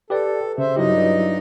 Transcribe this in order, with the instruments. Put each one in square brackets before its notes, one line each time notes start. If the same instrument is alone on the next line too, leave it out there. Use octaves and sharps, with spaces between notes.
[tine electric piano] G4 B4 D5 [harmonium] A4
[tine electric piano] C#3 [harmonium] C5 E5
[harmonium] G2 D#4 D#5 [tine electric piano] F#3 E4 G4